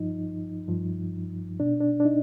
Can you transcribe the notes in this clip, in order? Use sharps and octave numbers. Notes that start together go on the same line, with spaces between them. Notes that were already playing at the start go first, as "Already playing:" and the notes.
Already playing: G2 F3 D#4
G2 F3
B2 D4
D4
D4
D#4